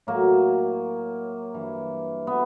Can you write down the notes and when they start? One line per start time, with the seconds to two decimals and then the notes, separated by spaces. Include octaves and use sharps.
0.07 A2 F#3 A#3
1.54 G2 E3
2.27 B3